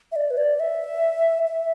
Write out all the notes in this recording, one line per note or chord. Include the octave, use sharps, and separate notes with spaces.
E5
D5
B4
D5
E5
E5